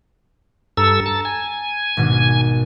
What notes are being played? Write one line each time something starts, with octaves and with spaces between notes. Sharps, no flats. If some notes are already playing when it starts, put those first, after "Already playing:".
G2 A4 A#5 E6
A5
G#5
G#1 B2 D4